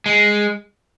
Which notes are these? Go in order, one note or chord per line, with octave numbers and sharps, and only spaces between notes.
G#3